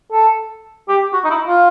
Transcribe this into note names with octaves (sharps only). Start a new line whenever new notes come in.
A4
G4
F#4
D#4
E4
F4